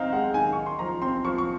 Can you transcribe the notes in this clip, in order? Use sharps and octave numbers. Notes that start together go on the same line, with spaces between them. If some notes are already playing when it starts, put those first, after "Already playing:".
Already playing: D#3 C4 D#4 F5 A#5
G#3 F#5
D#3 G#5
D#4 C#6
C6
F3 A#5
C4 C6
F3 C#6
C#6